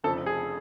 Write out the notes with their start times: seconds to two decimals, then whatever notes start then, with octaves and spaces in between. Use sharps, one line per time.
0.04 F1 F2 C#3 F3 A4
0.26 G#4